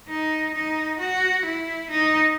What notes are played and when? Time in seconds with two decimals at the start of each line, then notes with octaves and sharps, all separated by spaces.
0.09 D#4
0.55 D#4
1.00 F#4
1.45 E4
1.91 D#4